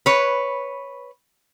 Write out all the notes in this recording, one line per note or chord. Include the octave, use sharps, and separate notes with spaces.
B4 C#5